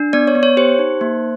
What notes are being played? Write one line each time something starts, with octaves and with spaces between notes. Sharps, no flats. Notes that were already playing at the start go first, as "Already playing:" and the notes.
Already playing: D4
B3 D5
C#5
B3
C#5
G4 C5
D#4
A#3